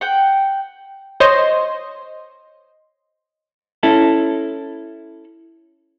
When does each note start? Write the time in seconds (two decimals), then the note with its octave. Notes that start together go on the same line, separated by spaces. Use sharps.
0.01 F#5 G5
1.20 C5 C#5 D#5 C6
3.83 C#4 E4 A4